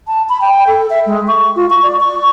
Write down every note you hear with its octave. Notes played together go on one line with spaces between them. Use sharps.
A5
B5
G5
A4
E5
G#3
C#6
F4
C#6
D5
C#6